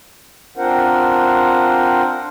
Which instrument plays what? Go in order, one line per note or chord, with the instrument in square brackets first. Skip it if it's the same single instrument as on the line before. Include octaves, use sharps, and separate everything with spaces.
[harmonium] C4 D4 F4 A#4 C5 F#5